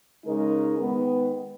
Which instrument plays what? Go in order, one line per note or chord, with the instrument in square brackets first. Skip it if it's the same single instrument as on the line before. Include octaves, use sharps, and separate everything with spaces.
[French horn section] C#3 G#3 D#4 A#4
D#3 G#3 B3